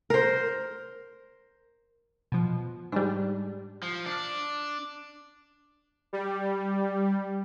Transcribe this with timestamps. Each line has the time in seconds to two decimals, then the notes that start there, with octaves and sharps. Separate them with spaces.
0.10 A#4 C5
2.32 B2 F3
2.92 G#2 G3 D4
3.83 F3
4.06 D4
6.13 G3